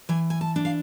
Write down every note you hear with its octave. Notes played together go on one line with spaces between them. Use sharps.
E3 G#5
G#5
A5
D4
F5